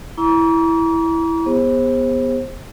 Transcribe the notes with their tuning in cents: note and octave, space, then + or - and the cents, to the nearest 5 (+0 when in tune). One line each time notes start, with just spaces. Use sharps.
E4 +0 A#5 +30 D6 -45
B3 +0 G#4 -45 C5 +25